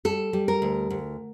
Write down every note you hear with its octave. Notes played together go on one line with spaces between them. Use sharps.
G3 A4
G3
A#4
D2
D2